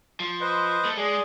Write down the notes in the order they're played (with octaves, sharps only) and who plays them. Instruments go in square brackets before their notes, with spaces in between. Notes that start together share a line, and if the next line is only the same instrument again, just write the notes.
[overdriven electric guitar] F3
[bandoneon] B4 C5 D#5
[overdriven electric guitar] A3 A4
[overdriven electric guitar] G#3 [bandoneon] G#4 D5